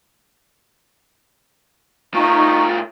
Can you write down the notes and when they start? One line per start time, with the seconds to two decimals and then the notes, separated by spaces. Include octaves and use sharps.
2.14 A2 D#4 F4 A#5 C#6